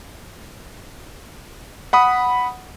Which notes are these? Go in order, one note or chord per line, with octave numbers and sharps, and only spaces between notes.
F#5 B5 D#6